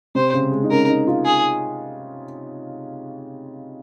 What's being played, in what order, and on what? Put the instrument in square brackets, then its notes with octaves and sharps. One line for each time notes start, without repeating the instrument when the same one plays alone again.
[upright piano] C3 [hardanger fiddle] C5
[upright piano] C#3
G#3
D#4
[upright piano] C#4 [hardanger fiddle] A#4
[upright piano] D#4
F4
[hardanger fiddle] G#4